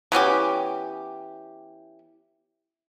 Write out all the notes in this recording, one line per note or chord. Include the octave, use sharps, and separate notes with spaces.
E3 B3 C#4 G4